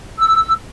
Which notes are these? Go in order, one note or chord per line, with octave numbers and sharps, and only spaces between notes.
E6